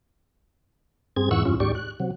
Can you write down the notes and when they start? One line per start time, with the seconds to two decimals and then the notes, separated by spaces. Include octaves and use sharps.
1.16 G2 C4 G#4 G#6
1.31 F2 G#2 E3 F#5 C#6 E6
1.45 E2 G2 C#4 F4
1.60 D#2 G#2 G4 D5 C#6
1.75 F#6
2.00 C3 F#3